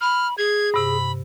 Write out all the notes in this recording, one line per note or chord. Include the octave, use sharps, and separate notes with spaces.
B5 F6
G#4 G#6
G2 C3 B5